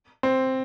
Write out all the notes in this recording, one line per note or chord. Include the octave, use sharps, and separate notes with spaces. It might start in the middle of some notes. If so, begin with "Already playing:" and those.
C4